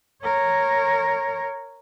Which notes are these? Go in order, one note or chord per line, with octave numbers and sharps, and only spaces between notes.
A#4 C#5